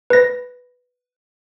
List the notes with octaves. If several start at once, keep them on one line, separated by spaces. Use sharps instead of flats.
B4 A#6